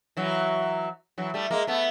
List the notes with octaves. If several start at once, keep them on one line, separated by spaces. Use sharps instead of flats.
E3 F#3
E3 F#3
G3 A3
G#3 A#3
A3 B3